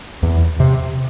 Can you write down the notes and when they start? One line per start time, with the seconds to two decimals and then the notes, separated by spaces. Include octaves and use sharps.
0.23 E2
0.60 C3